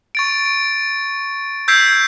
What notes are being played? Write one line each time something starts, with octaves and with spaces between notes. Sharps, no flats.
C#6 A6 D7
D7
E6 G6 G#6 B6 C7 D7